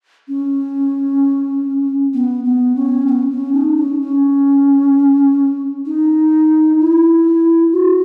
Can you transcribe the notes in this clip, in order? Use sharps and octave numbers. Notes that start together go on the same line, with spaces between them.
C#4
B3
B3
C#4
B3
C#4
D#4
C#4
C#4
D#4
E4
F#4